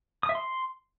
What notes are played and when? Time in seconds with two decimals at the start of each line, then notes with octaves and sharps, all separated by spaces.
0.23 D#6
0.29 E5
0.35 C6